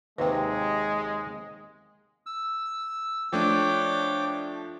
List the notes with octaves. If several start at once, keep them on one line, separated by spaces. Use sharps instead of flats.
D#2 C3 G#3 B4 G5
E6
F3 A3 D4 C#5 G5 D6